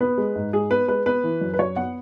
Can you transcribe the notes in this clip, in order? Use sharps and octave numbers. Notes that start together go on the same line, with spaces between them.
B3 B4
G#3
G#2
G#2 G#4
B3 B4
G#3 B4
B3 B4
E3
F#2
B4
F#2 C#5
B3 F#5